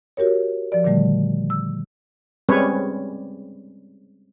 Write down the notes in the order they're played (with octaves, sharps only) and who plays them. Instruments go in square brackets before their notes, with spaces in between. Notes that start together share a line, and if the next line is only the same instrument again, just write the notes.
[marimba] F#4 G4 A#4 C#5
F3 D5
A#2 D3 D#3 G3 A3
E6
[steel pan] G3 G#3 C4 C#4 B4 C#5